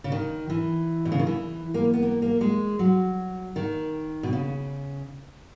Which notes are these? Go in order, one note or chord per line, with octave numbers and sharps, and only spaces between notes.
C#3
D#3
E3
B2
C#3
D#3
E3
A#3
B3
A#3
A#3
G#3
F#3
D#3
B2
C#3